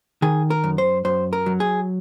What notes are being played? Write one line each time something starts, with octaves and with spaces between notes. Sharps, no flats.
D#3 G#4
A#4
F#2
C5
F#2 C5
A#4
F#3
G#4